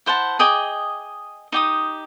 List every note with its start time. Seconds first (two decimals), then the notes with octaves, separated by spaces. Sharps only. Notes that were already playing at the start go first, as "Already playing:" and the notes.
0.06 E4 C5 F#5 A5
0.39 G#4 D#5 G5 D6
1.52 D#4 G4 D#6